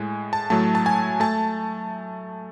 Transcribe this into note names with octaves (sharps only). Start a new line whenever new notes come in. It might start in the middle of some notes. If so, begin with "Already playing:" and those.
Already playing: A2 G#3 G#5
A5
A2 F#3 A3 A5
A5
G#5
A3 A5